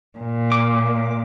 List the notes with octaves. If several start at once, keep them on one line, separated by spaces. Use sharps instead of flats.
A#2
D6